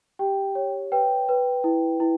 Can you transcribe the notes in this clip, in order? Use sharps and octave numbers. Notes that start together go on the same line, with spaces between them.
G4 G5
C#5
B4 G5
B4
E4
E4